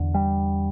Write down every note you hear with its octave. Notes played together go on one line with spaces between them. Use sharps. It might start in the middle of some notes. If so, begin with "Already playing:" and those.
Already playing: E2 D3
G3